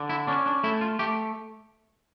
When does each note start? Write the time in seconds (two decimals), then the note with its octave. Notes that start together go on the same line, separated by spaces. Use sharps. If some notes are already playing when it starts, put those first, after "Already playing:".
Already playing: D3
0.09 E4
0.27 C#4 D4
0.46 D4
0.64 A3 E4
0.81 F4
0.99 A3 G4